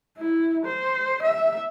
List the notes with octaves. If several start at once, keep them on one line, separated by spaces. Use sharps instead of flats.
E4
C5
E5